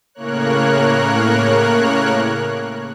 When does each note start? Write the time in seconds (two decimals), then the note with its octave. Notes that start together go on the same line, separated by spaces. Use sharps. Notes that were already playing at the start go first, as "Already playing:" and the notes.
0.14 A2 C#3 A#3 A#4 C#5 F#6